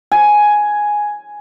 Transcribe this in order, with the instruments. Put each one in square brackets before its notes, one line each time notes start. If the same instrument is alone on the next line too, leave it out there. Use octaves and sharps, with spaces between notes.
[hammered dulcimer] G#5